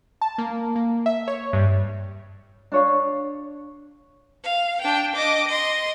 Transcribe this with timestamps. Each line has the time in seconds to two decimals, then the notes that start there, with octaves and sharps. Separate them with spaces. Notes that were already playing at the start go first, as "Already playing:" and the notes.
0.22 A5
0.38 A#3
0.76 A#3
1.06 E5
1.28 C#5
1.53 G2
2.72 D4 C#5 F5
4.43 F5
4.82 D4 G5
5.15 D#5 D6
5.47 D#5 C6